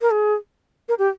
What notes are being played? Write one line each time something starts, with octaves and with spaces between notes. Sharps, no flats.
A#4
G#4
A#4
G4